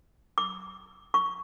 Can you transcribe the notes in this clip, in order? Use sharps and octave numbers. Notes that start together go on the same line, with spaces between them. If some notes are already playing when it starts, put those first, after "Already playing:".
D6
C#6